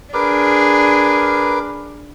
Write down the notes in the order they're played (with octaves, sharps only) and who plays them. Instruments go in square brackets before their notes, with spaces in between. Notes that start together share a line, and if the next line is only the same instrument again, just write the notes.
[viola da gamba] D4 G#4 [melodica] A#4 B4 D6